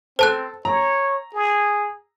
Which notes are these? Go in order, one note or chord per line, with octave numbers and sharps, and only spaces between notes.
C4 A4 C5 A5 F#6
C#5 A#5
G#4